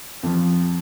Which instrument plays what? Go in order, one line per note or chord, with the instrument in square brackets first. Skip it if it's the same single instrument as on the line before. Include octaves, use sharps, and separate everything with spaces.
[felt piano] F2 F3